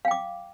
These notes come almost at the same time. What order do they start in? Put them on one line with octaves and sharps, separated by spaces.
F5 G5 D6